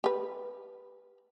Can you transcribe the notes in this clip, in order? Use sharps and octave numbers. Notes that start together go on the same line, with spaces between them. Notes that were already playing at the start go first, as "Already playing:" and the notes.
G4 B4